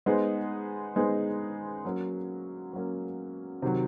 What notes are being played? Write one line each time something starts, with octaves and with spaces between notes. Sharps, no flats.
G#3 B3 D#4 G#4 C5
G#3 B3 D#4 G#4 C5
F#3 A#3 C#4
F#3 A#3 C#4
C3 D#3 F#3